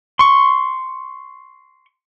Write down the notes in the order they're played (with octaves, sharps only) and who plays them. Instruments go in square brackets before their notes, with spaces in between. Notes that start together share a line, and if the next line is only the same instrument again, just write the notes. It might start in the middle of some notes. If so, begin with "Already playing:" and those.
[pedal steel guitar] C6 C#6